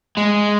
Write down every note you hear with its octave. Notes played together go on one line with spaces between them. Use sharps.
G#3